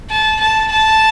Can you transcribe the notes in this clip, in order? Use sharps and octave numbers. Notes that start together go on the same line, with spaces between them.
A5
A5
A5